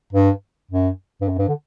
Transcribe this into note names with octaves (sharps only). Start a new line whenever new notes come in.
G2
F#2
G2
F#2
G2
D3